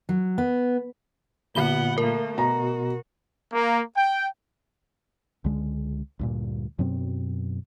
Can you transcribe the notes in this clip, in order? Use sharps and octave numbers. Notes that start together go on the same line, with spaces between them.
F#3
B3
A#2 D3 B3 F#5 B5 G7
A3 A#3 A#4
B2 F#4 A#5
A#3
G5
C#2 D3 G#3
D2 G2 A#2
F#2 B2 F#3 C4